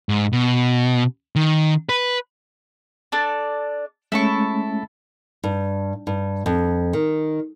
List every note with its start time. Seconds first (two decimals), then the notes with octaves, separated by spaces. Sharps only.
0.09 G#2
0.33 B2
1.36 D#3
1.89 B4
3.12 D4 A4 D5
4.12 G#3 A3 C#4 E4 A4 C#6
5.44 G2
6.07 G2
6.46 F2
6.93 D#3